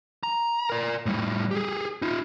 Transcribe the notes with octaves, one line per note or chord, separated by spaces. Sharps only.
A#5
A#4 D5
A2 G3
G4 G#4
D#4 F4